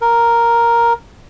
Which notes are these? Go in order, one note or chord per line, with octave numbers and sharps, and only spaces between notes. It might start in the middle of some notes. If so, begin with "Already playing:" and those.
A#4